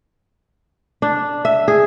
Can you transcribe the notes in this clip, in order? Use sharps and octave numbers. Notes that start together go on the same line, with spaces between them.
D4
E5
G#4